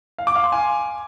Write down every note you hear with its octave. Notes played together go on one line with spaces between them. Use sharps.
F5
D6
F5
C6
G#5